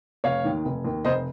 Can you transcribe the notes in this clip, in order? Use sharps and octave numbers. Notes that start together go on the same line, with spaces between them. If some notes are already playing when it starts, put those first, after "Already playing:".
F1 C#5 F5
D#2 D#3
F1
D#2 D#3
F1 C5 D#5